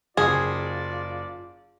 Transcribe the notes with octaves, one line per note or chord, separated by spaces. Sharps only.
F#1 F4 G#4 D5